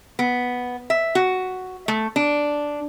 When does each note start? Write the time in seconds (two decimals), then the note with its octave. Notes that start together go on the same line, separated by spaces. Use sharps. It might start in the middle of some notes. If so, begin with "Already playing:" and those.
0.19 B3
0.90 E5
1.15 F#4
1.88 A3
2.16 D4